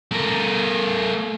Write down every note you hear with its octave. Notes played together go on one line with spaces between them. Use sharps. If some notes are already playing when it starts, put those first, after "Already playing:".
A3 A#4